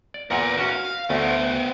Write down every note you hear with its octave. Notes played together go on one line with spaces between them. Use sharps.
D5
E2 A#2 A#4 B4 F#5
C#4 F#4
F5
D2 A3 B3 C5